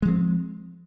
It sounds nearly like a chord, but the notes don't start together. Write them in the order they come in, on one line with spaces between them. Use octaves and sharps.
G#3 F3 C4